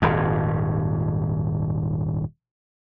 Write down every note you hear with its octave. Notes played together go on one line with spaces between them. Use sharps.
D#1 G#1 F2